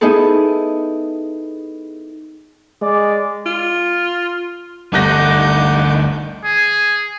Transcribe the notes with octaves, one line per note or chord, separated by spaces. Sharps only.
B3 D#4 E4 G#4 A4
G#3 D5
F4
G1 D2 D#4 F#5 D6 F#6 G6 A#6
G#4